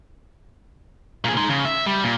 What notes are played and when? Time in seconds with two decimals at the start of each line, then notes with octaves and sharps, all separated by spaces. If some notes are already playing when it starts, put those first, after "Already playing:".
1.24 A#2 G#4
1.37 D#4 C6
1.49 C#3
1.65 E5
1.86 G3
2.03 A#2